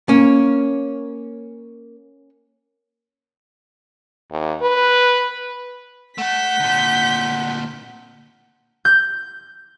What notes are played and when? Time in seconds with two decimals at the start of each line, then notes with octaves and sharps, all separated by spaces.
0.09 A#3 C#4
4.32 D#2
4.62 B4
6.18 A3 F#5 A5 G6 B6
6.60 D2 A#2
8.85 G6